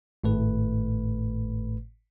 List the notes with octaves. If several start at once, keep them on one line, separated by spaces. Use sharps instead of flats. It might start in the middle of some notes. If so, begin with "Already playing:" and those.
G#1 A2 A3 B4